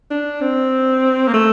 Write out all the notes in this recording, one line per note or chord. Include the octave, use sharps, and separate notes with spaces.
D4
C4
A#3
A3